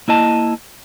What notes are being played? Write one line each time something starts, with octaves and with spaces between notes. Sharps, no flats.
A#3 E4 D#5 A5